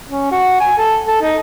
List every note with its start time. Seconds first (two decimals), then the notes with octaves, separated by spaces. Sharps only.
0.09 C#4
0.31 F#4
0.60 G#5
0.78 A4
1.07 A4
1.22 D#4